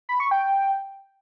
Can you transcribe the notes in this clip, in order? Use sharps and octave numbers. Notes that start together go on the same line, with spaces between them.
B5
C#6
G5